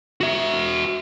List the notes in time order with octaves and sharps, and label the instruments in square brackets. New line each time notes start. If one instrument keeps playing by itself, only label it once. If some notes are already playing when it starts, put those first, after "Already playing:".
[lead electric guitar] F#4 E5